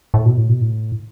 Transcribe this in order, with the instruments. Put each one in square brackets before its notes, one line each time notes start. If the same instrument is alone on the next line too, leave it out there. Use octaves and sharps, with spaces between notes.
[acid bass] A2
B2
A2
B2
A2